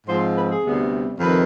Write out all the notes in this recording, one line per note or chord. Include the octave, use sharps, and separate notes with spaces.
G#2 F3 G#3 C4 C5
B4
G#4
D2 C3 G3 B3
F2 C3 D#3 B4